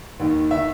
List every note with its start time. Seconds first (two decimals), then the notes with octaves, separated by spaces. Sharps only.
0.20 D#2 D#3
0.51 E5
0.56 D#3